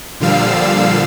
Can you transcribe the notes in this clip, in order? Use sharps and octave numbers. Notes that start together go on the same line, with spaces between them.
A#2 D3 F3 G3 F5 E6